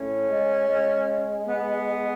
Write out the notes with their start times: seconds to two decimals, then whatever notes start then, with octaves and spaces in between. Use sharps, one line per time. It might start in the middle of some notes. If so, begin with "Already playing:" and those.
Already playing: A2 C#4
0.30 G#3
0.69 G#3
1.47 B3